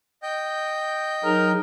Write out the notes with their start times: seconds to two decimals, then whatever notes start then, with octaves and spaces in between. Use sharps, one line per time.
0.23 D#5 G5 G6
1.24 F#3 D#4 G#4 A#4